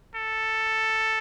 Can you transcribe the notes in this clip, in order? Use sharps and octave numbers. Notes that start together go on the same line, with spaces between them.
A4